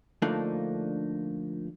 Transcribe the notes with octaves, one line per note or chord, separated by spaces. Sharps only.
D3 F3 A3 A#3 D4 D#4